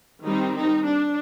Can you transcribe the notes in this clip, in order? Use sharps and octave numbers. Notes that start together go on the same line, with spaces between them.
D#3 G3 C4 D#4
D#4
D4